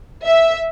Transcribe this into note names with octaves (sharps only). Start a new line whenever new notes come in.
E5